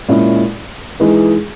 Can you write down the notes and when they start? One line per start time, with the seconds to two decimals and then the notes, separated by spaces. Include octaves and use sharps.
0.08 A#2 G#3 C#4 E4
1.00 E3 G#3 D#4 G#4